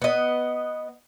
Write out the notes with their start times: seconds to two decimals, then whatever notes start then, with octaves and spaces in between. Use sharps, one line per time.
0.02 B3 D#5